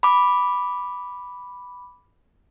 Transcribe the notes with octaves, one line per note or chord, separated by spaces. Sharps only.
B5 D6